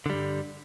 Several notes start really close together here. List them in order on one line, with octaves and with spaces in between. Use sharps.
D3 G3 G2